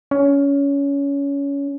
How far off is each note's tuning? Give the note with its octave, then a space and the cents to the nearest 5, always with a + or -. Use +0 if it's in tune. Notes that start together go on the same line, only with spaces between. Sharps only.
C#4 +20